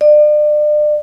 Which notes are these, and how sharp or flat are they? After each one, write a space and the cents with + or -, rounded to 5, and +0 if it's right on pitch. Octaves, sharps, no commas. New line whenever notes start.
D5 +35